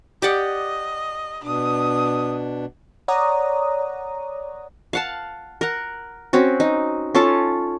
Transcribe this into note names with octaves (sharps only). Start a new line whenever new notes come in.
G4 D5 D#5 F#5
B2 D4 D#6
C#5 D5 F#5 A#5 D#6
F5 F#5 A5
A#4 F#5
C4 C#4 F#4
D#4
C#4 F4 A4 A5